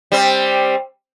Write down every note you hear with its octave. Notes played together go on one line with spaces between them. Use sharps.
G3 C4